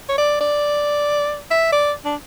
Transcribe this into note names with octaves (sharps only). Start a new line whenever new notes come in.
C#5
D5
D5
E5
D5
D4